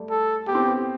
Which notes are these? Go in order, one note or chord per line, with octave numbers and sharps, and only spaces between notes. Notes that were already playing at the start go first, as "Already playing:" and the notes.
Already playing: G3 A3
A4
B3 G4
C4
B3